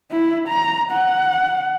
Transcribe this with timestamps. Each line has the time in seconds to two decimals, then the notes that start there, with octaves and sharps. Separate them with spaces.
0.12 E4
0.48 A#5
0.92 F#5